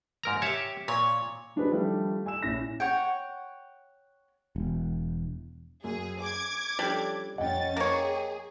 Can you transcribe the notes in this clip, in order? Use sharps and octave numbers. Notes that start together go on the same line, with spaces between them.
G#2 A#4 A#5
G4 C#5 E5 D6
A#2 C#5
F#3 D4 D#4 G#4 B4 C5
D#3 F3 G3 A3 D4
G#5 E6 E7
A#1 C#4 E4 A#6
C#5 F#5 G5
E1
F#2 G#4
G#5 D6 G#6
F3 G3 C#4 D4 A4
F2 C#4 D#5 F#5 G5 A6
A#3 G#4 C#5